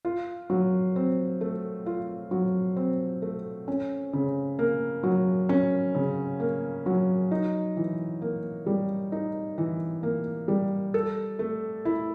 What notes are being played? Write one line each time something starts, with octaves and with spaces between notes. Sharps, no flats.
F4
F#3
C4
A3
F4
F#3
C4
A3
C#4
C#3
A#3
F#3
C#4
C#3
A#3
F#3
D#4
E3
A#3
G3
D#4
E3
A#3
G3
A4
A3
E4